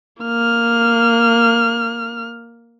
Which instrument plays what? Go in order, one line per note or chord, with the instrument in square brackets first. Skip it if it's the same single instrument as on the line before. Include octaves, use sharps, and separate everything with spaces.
[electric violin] A#3 F6